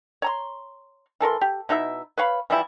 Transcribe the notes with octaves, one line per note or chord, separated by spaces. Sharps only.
C#5 A#5 C6
E3 A4 A#4 C6
G4
B2 D#4 E4 E5
B4 C#5 F5 B5
E3 F3 G3 E4